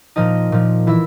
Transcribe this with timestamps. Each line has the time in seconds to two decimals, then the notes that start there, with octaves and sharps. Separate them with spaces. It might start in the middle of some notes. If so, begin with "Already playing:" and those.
0.16 A#2 F3 D#4 D#5
0.52 A#2 F3
0.87 E3 E4 E5